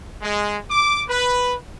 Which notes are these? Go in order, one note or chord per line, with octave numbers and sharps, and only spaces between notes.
G#3
D6
B4